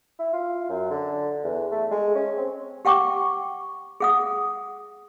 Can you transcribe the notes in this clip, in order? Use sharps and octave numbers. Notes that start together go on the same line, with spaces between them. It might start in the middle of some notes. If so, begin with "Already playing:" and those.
E4
F4
F#2
D3
E2
A3
G#3
C#4
C4
G4 F#5 G5 C#6 D6
G#4 F#5 D#6